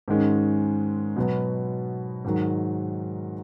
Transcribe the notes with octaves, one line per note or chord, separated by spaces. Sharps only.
G#2 D#3 G#3 C#4
B2 F#3 B3
G#2 D#3 F#3